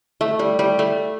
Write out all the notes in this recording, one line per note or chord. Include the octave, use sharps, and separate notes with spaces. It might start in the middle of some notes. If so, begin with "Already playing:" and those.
A3
G3
G3
A3